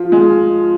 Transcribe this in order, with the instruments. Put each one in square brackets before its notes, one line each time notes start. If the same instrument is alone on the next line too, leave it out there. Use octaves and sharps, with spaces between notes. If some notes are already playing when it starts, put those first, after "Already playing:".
Already playing: [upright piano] F3 F4
G#3